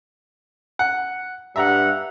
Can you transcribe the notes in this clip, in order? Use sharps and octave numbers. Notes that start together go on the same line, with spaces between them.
F#5
G2 G3 E5 F#5 A#5